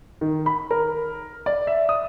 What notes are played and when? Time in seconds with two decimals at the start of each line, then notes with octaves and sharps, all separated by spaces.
0.21 D#3
0.46 B5
0.71 A#4
1.46 D5
1.67 E5
1.89 D#6